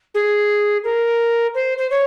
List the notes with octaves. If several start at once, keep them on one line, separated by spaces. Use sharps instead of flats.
G#4
A#4
C5
C5
C#5